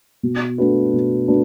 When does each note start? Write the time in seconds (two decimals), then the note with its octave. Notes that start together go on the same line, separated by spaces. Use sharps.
0.23 B2
0.58 A3 D4 F#4 B4
0.93 B2
1.28 A3 D4 F#4 B4